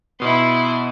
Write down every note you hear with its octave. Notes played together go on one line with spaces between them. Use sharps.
B2 B3 E4 C6